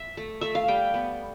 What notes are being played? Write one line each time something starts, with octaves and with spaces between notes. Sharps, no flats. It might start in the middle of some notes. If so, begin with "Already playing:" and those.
Already playing: E5
A3
A3 E5
F5
G3 G5
B3